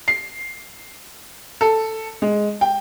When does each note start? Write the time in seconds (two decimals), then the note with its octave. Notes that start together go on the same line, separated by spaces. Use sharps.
0.08 C7
1.61 A4
2.22 G#3
2.61 G5